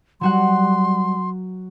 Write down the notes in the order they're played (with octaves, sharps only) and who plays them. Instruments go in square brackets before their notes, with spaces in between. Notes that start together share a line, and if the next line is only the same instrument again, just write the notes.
[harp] F#3 F#4 F#5 [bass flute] G3 [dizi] C6